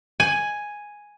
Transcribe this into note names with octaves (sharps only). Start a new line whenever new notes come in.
G#5